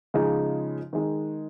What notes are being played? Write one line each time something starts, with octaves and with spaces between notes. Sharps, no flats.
C#3 F3 G#3 D#4
D#3 G#3 D#4